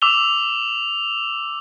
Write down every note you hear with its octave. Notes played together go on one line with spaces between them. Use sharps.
D6 E6 F7 G7